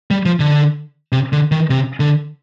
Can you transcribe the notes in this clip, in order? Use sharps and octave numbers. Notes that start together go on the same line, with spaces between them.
G3
F3
D3
C3
D3
D#3
C3
D3